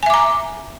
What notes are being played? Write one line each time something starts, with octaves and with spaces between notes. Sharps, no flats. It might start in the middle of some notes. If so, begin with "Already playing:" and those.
E5 G#5 A#5 D6